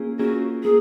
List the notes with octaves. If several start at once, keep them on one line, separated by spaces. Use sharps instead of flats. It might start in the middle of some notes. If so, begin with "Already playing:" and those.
Already playing: A#3 C#4 F4 G#4
A#3 C#4 F4 F#4 G#4
A#3 G#4